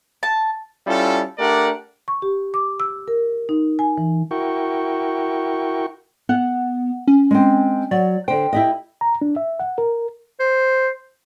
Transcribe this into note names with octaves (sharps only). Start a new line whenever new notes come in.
A5
G3 C#4 E4 F4 A4
A3 D4 G4 A#4 D5 F#5
C#6
G4
D6
E6
A#4
D#4
G#5
E3
E4 F#4 A#4 G5 C#6
B3 F#5
C#4
G#3 C4
F#3 D5
D3 C5 G5
E4 G4 D#5
A#5
D4
E5
F#5
A#4
C5